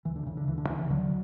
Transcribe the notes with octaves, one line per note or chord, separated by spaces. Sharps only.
D2 E3
D3
C#3 E3
D3
D2 E3
D3
C#3 E3
E3
D2 D3 F#3